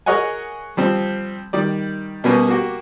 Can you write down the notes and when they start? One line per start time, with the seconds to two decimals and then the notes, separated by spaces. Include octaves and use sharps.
0.06 G#4 A#4 C#5 D#5 F#5 G#5
0.77 F3 G3 C4
1.53 D#3 G3 D5
2.24 B2 G3 A#3 B3 C#4
2.49 A#3 F#4 G4